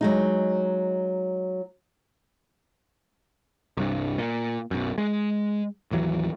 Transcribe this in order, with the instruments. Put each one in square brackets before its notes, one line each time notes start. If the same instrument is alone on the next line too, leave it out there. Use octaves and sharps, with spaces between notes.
[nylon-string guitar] F#3 G#3 D#4
[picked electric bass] C2 G2
A#2
B1 F#2
G#3
A1 D#2 E3 F#3